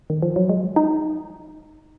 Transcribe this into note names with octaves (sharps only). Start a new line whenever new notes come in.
D#3
F3
F#3
G#3
D#4